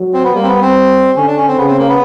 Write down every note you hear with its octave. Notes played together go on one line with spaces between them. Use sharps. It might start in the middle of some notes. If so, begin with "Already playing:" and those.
Already playing: F#3
C4
B3
G3 A#3
C4
B3
C4
D3 C#4
D4
C#4
C4
C#3 B3
C4
A#3
B3